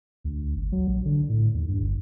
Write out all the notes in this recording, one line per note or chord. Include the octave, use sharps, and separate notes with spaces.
D2
G1
F#3
A#1
D3
A2
D#2
G2
G1